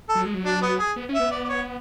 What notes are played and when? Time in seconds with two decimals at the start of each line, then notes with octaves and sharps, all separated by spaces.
0.09 A4
0.15 F#3
0.25 G#3
0.34 F#3
0.45 D4
0.62 B3
0.79 G#4
0.96 B3
1.09 C#4
1.14 E5
1.20 B3
1.32 D5
1.44 D5
1.49 C#5